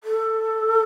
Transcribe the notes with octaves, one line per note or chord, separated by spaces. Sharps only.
A4